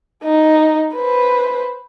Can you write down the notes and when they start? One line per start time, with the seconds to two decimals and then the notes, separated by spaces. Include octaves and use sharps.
0.24 D#4
0.94 B4 C5